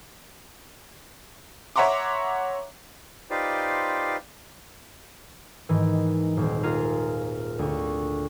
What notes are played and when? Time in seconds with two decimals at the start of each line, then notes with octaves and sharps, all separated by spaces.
1.76 C#5 E5 F#5 A#5 C6 D6
3.30 D#4 F4 G4 B4 C5 D5
5.69 G#2 D#3 E3
6.37 D#1 C4
6.63 F4 G#4 A#4 F5
7.59 D2 C#6